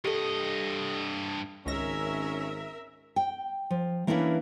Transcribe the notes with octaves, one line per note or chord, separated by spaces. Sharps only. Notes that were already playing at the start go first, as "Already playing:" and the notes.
G2 G4 A4 D#5
G#1 C#2 G#3 C#4 A#4 E5 A#6
G5
F3
E3 A#3 C#4 D4 E4 B4